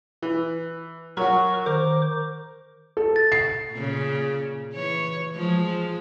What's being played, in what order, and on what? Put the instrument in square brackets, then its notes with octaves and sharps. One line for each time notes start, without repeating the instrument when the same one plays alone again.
[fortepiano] E3
[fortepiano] F#3 F#4 [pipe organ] A#4 C#6
[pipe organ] D#3 C5 D6 [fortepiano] A#4
[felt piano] A4
[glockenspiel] A6
[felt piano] C7
[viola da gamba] A#2 C#3
E3 C#5
F3 G#3